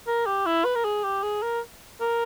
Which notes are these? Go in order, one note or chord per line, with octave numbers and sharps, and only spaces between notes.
A#4
G4
E4
B4
A#4
G#4
G4
G#4
A#4
A#4